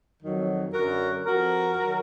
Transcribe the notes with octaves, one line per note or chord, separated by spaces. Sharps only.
F2 D#3 F#3
F#2 D3 F#3 F#4 A#4
F2 F3 F#4 A#4
D#3 F#3